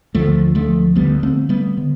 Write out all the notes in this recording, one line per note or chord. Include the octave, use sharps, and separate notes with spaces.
D2 D3 F3 A3
F3 A3
D2 D3 G3 B3
A3 C4
G3 B3
D3